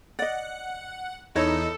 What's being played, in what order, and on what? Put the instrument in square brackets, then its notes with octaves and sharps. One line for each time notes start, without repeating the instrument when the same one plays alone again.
[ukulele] D5 D#5 [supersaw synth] F#5
[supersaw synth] E2 D#4 [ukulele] E4 C#5 D#5 [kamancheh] A4